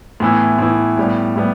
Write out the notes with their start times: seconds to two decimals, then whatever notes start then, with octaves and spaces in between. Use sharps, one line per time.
0.20 A2 E3 B3 E4
0.59 A2 E3 B3 E4
0.97 A2 G3 B3
1.36 A2 G3 B3